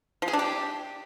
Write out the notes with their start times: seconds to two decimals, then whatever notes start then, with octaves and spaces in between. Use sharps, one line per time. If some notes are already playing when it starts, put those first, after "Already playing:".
0.22 F3
0.28 G#4
0.33 D4
0.39 G4